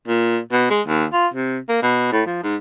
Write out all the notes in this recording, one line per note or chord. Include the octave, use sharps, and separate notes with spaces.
A#2
B2
G#3
D#2
F4
C3
A#3
B2
A2
F3
G#2